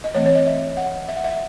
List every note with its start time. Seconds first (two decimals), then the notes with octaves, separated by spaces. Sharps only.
0.04 D#5
0.14 E3 A3 C4 C#5
0.26 C#5
0.35 D#5
0.46 E5
0.77 F#5
1.08 E5
1.16 F#5
1.24 E5